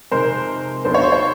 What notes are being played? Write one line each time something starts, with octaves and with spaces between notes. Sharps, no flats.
F2 C3 D#3 G#3 A#4 C5
D#2 D#3 F#3 B3 D4 C5
C#5
C5
C#5